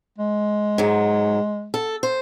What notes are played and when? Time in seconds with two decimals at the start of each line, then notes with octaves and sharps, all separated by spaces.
0.18 G#3
0.78 G#2 F#3
1.74 A4
2.03 C5